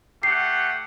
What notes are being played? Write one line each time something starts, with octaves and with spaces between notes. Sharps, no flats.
A3 G4 F#5 C7